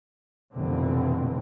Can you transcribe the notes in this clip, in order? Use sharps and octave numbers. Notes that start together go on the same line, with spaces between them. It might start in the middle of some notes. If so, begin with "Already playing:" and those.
F1 A#1 B2 D3 E3 C4